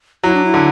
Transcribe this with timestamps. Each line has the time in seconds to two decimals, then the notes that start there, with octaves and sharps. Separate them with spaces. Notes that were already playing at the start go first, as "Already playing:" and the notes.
0.24 F#3 E4
0.34 D4
0.45 E4
0.54 D3